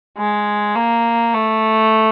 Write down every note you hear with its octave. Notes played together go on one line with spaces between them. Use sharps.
G#3
A#3
A3